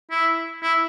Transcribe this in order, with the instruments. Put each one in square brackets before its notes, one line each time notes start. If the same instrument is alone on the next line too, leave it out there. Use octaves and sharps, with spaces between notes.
[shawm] E4
E4